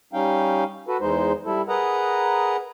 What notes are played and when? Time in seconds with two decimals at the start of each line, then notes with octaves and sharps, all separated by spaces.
0.13 G3 C#4 D#4 F5 G5
0.88 F#4 A4 B4
1.00 E2 G#3 D#4 C5
1.45 G3 E4 A4
1.68 G#4 A#4 B4 D#5 F#5 A#5